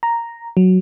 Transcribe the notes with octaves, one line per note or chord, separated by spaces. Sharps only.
A#5
F#3